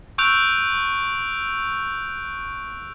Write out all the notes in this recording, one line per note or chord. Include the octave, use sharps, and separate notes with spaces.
C#6 E6 F#6 G6 D7 F7